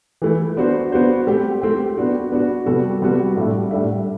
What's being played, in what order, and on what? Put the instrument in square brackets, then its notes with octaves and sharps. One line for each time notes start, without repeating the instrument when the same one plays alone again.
[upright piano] E3 A3 E4
B3 D4 F#4 C5
B3 D4 F#4 C5
A3 C4 G4
A3 C4 G4
B3 D4 F#4
B3 D4 F#4
C3 G3 B3 F#4 A4
C3 G3 B3 F#4 A4
A2 G3 D4 A4 E5
A2 G3 D4 A4 E5